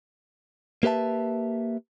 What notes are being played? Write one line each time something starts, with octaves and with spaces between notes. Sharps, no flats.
A#3 G4 B4 E5 A5